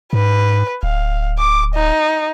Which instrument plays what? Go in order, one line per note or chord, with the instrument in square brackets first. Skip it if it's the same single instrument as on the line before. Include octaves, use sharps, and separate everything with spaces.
[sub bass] G#2 [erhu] B4
[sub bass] D1 [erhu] F5
[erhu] D6
D#4